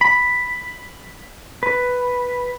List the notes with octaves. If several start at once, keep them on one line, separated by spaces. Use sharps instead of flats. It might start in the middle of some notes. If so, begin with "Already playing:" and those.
B5
B4